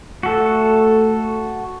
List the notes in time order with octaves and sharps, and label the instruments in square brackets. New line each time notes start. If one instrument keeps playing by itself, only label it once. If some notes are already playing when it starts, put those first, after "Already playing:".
[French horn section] A3 [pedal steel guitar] F#4 A4